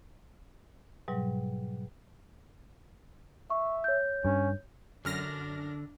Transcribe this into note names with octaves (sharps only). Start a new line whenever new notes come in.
G#2 B2 F#3 G3
E5 C#6
C#5 G6
G2 C#4
F#2 D3 D4 F6 A#6